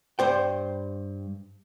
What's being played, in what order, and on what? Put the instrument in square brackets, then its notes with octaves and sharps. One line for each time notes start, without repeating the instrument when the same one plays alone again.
[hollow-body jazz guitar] G2 C5 G5